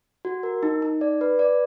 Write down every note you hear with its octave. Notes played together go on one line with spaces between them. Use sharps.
F#4
A#4
D#4
D#4
D5
B4
D5